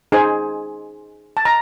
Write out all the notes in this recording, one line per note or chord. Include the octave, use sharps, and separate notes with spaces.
D#4 G#4 C5 G#5
A5
A#5